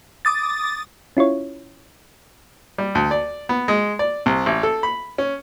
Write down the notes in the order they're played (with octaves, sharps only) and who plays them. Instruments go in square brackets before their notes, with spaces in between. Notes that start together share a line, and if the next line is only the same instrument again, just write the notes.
[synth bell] D6 D#6 A6
[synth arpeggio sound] C#4 E4 F4 C#5
[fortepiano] G3
D2
D5
B3
G#3
D5
C2
A1
A4
B5
C#4